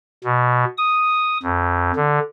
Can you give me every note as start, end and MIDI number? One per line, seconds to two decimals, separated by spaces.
0.24 0.65 47
0.78 1.37 87
1.43 1.92 41
1.96 2.19 50